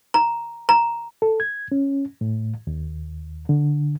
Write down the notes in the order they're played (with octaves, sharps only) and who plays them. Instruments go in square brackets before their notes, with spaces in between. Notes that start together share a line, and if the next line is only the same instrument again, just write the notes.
[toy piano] A#5
A#5
[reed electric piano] A4
G#6
C#4
A2
D#2
D3